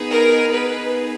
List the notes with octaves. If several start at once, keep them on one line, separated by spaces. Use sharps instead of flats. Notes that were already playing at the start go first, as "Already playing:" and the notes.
Already playing: B3 D#4 G#4
A#4
B3 D#4 G#4 B4